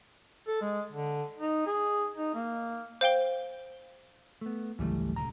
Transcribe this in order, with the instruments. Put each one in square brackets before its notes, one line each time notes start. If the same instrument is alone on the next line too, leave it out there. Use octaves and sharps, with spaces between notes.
[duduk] A4
G#3
D3
D#4
G#4
D#4
A#3
[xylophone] C5 F5 G5 G7
[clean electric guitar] A3 B3
[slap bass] G#1 C#2 F#3 [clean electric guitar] E3 G3 A3
[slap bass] D#1 C#2 D3 [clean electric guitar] A#5